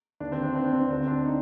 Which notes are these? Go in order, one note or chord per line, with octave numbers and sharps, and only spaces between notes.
D#2 D3 D4
C4
D4
C4
D4
C4
D4
D2 D3 C4
D4
D#4